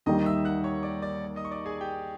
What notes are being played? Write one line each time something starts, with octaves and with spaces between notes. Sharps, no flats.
D#2 D#3 G3 D#5 D#6
E5 E6
F#5 F#6
C#5 C#6
D5 D6
D5 D6
D#5 D#6
C#6
D5 D6
G#4 G#5
G4 G5